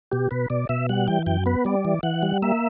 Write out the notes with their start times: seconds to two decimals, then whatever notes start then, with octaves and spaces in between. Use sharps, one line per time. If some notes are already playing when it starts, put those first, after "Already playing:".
0.12 B2 G4
0.31 B2 B4
0.50 B2 D5
0.69 B2 E5
0.89 G3 F#5
1.08 E3 G5
1.26 F#2 G5
1.46 B3 B4
1.65 G3 D5
1.85 E3
2.03 E3 F#5
2.23 G3
2.42 A#3 E5